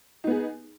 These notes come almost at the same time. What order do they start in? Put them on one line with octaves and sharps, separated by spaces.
D#4 B3 G#4